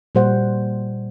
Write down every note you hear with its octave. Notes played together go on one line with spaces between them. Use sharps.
A#2 G3 C5 F#5